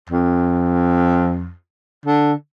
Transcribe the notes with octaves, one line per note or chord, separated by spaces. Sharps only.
F2
D3